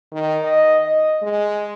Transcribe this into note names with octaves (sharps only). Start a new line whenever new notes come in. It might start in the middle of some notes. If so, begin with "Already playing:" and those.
D#3
D#5
D#5
G#3